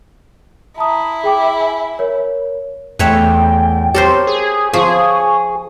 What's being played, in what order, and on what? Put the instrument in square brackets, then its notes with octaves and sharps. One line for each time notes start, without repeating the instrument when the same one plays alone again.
[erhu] E4 [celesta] A5 A#5 D#6
[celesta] G#4 G5 D6
G#5
A#4 C#5
[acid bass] E2 [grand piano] A3 [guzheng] B4 C#5 E5 [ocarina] G5
[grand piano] G4 C#5 [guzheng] A4 A#4 C5
[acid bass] G#4
[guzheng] F3 [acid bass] G#4 [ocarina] C#6